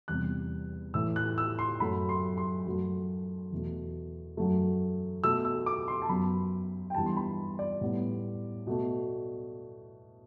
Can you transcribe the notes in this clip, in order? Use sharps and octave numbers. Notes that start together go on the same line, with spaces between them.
E2 C3 G3 F#6
A2 E3 A3 E6
F#6
E6
C6
F#2 F#3 A3 B5
C6
C6
F#2 F#3 A3
E2 B2 A3
F#2 F#3 A3
B2 A3 E6
E6
D6
C6
A5
F#2 F#3 B3 B5
G5
G2 E3 G3 B3 A5
C6
B5
D5
A2 G3 B3
B2 A3